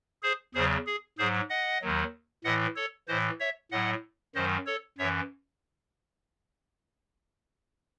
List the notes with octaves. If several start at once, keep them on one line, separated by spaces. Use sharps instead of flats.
G#4 C5
E2 C#3 F#3 G#4 C5
G#4
G#2 F#3 G#4 C5
D#5 F#5
D#2 D#3 F#3
A2 E3 D#5 F#5
A4 C#5
A2 E3 C5 D#5
C#5 E5
A2 F#3 D#5 F#5
F#2 D#3 F#3 C5 D#5
A4 C#5
F#2 E3 C#5 E5